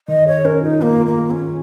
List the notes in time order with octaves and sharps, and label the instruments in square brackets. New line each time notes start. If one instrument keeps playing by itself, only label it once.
[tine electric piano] D#3 [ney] D#5
[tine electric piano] G#4 [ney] C#5
[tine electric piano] C#4 [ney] A#4
[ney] D#4 [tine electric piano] F4
[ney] A#3 [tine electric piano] F4
[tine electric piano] F4
[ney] A#3
[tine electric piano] G#4
[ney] C#4
[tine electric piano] F4